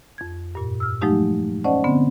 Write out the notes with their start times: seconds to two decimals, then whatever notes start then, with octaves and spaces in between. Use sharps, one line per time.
0.18 F2 G#6
0.55 G2 A#2
0.80 E6 F6
1.01 F3 F#3 G#3 A3 D#4 G4
1.64 C#4 C5 D5 D#5 F#5 A5
1.84 D3 B3 C4